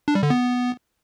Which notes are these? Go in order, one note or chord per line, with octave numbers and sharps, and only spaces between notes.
D4
G3
D3
B3